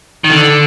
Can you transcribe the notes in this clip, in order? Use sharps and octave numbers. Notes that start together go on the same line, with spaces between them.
D#3
D3